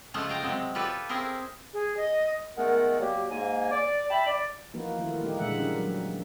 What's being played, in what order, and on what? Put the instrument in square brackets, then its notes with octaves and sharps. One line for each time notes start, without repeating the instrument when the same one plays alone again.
[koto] C#3 F3 G#3 A3 F4 F#5
F5 G5 A#5
C3 F#3 G#3 C4
F4 G4 A4 B4 C#5 D5
C4 E4 G#4 A#4 C5
[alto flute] G#4
D#5
[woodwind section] D#3 G#3 A3 B3 A#4 F#5
F#3 G3 A#3 G4
G#2 A#3 G#5
D5
E5 G5 A5 B5
D5
[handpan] E3 F3 A#3 D#4 F#4 B4
D#3 E3 A3 E4 F4
G3 A3 A#3 D#4 G4
A#2 D3 E3 G#3 E5 F#5
F3 G3 C#4 D4 A#4
F#3